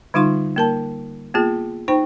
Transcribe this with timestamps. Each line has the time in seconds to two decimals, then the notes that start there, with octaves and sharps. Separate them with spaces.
0.14 D3 G3 D#4 F4 F5 C6
0.56 A#3 A#4 A5
1.35 A#3 B3 F4 G#4
1.88 D#4 C5 G5 B5